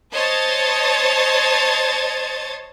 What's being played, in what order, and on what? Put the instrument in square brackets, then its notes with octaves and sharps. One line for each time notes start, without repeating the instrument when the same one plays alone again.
[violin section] C5 C#5 D#5 A5 G#6 A6